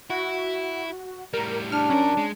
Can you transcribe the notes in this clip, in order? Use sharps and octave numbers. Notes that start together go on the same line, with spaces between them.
E4 F#4
A2 G3 A#4
D4 F6
F#3 C#4 A#4
G#3